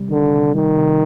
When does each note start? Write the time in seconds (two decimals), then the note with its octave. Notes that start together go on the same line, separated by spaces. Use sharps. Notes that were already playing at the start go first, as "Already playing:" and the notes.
Already playing: C3 G3
0.10 D3 D#3
0.33 C3
0.55 D#3 G3
0.77 C3